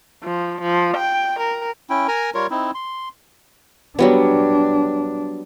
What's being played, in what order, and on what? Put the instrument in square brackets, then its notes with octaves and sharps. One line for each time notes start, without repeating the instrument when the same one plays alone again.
[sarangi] F3
F3
G5
A#4
[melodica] C#4 E4 G5
A#4 G#5 A#5
G3 F4 A#4 C#5
C4 D#4 E4
C6
[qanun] F#3 G3 B3 [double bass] D4